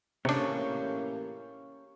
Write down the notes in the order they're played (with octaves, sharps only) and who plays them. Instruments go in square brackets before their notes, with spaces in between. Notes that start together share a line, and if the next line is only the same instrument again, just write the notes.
[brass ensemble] A2 E3 A#3 [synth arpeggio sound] C3 D4 [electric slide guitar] C#4 G4 C#5